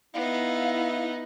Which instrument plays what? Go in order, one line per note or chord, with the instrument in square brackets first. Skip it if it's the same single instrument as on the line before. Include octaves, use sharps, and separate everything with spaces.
[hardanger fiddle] B3 D#4 [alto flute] E4 [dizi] F5